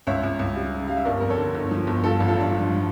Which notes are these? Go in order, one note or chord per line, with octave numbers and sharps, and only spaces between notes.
C#2 C#5 E5
C#2
C#2
G3
C#3
G3 F5
E5
G1 A#4 D5
F2 A#4
A4 C#5
D3
G1
F3
G1
G2 F4 A4
A1
F4 A4
G2 D4
F3
F3